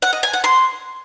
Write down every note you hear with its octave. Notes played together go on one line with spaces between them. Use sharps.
F#5
D#5
G#5
F#5
C6